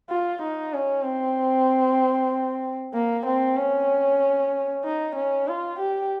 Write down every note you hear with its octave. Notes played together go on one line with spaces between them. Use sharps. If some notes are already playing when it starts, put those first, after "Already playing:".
F4
D#4
C#4
C4
A#3
C4
C#4
D#4
C#4
F4
G4